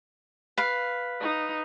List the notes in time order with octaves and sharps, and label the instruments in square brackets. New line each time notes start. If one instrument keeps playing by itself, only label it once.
[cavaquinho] B4 F5
[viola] D#4